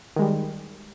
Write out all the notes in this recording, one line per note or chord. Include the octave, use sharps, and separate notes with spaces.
D#3 G3 G#3